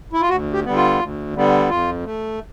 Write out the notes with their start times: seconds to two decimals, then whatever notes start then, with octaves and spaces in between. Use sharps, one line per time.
0.13 E4
0.21 F4
0.29 D2 F#4
0.53 G4
0.65 D3 G3 B3
0.76 F4
0.99 D2
1.35 D3 G3 B3
1.69 F2 F4
2.05 A3